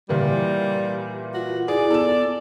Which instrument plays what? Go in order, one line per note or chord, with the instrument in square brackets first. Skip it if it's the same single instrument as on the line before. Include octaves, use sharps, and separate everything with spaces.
[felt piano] A#2 E3 A#3 [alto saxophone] G3
[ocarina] F4 [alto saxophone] F#4
[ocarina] E4 [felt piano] G#4 [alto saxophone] D5
[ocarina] B3 [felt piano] A4 E7